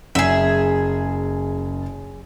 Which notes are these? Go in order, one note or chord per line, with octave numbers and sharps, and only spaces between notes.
F#1 G#4 E5